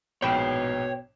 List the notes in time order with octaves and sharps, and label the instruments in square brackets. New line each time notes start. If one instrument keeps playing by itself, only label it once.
[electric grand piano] A#1 G#2 E7 [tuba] B2 [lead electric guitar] C#5 B5 [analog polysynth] G5